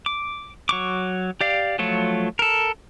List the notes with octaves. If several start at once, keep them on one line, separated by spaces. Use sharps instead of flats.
D6
F#3 C#6 D6
G4 D5 F5
F3 F#3 A3 F4 C#5
A4 A#4